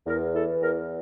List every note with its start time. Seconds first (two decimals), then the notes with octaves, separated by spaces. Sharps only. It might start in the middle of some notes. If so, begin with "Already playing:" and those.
0.07 E2 A#4
0.34 E3 A4
0.61 E2 A#4